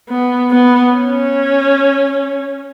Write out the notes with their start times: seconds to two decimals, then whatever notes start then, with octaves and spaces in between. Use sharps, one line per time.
0.10 B3
0.51 B3
0.94 C#4